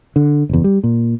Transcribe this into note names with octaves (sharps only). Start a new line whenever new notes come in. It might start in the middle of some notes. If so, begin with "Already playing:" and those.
D3
F#1 E2
G3
A#2